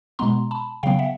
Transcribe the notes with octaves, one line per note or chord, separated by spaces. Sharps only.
B2 G#3 B3 A#5 C6
A5 B5
C#3 F#3 B3 F5 G5
E5 F#5